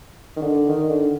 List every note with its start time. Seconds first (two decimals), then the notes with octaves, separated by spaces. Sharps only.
0.36 D#3
0.42 D3
0.68 D#3
0.89 D3